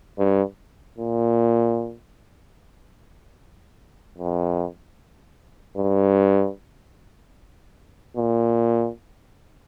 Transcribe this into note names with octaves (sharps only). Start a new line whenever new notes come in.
G2
A#2
F2
G2
A#2